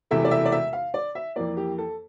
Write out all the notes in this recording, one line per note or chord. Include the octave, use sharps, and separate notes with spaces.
E1 E2 C3 E3 A3 E5
D5
E5
D5
E5
F5
D5
E5
F2 E3 A#3 D5
G4
A4